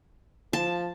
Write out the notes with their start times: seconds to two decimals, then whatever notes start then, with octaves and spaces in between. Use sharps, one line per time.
0.53 F3 A5